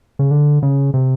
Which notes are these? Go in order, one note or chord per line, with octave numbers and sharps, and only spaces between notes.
C#3
D3
C#3
C3